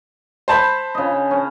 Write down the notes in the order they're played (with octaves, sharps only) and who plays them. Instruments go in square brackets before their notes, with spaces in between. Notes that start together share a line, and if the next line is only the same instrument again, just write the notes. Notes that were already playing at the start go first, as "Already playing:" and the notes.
[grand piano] C5 A5 B5
[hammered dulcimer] C#3 D#5
C#4